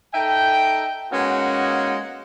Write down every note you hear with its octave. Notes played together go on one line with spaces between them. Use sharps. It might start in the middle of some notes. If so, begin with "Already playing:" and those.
D#4 A4 E5 G5
G#3 A#3 B3 C#4 D#4 F#4